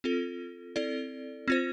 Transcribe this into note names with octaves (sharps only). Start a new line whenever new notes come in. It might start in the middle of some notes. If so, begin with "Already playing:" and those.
C4 F4 A4
C4 E4 A4 D5
C4 F4 C5